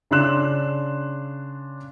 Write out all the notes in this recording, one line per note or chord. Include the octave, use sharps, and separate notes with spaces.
C#3 D4 C6 F#6 E7